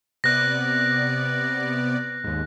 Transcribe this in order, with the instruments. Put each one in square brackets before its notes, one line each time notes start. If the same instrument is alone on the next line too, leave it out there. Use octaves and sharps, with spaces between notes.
[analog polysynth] C3 B3 D5 [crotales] F#6 A#6
[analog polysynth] D#2 G#2